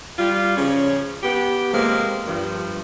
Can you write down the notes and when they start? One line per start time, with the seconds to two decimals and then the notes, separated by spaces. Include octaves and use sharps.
0.18 G3 F4
0.57 C#3 F3 C#4
1.23 B3 G4
1.73 C3 F3 G#3 A#3
2.26 G2 F3